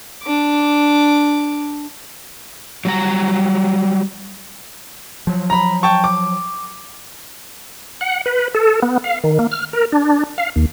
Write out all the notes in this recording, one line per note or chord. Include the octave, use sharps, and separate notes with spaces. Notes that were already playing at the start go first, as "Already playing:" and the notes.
D4 D6
F#3 G3 A#5
F3 F#3
A#5 B5
G5 A5 C#6
D6
F#5
B4
A4
B3
F5
D#3
A#3
F6
A#4
D4
F5
D#2